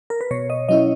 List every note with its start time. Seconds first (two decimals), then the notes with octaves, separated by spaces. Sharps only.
0.10 A#4
0.21 B4
0.31 B2 C#5
0.50 D#5
0.69 F#3 C#4 E4 D#5